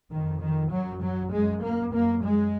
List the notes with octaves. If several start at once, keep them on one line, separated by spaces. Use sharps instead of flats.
F2 D#3
D#3
F#2 F#3
F#3
F#2 G#3
A#3
F#2 A#3
G#3